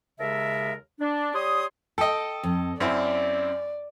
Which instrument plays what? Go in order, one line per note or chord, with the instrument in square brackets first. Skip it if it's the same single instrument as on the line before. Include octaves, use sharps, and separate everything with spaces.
[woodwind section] D#2 C#3 G#3 A4 A#4 E5
D4
G3 G4 C#5 C6 D#6
[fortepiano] A4 D#5 [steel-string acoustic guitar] G5
[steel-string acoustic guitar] F2
[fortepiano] F#2 C4 E4 [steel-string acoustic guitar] C#4 [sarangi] D5